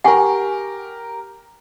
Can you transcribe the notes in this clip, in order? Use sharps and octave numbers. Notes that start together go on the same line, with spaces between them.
G4 A#4 F#5 G#5 C#6